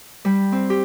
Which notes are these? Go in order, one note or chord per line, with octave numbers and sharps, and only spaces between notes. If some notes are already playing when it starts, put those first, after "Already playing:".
G3
C4
G4